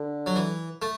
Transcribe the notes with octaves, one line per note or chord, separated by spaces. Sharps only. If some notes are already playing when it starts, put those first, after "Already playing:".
Already playing: D3
F#3
E3
A3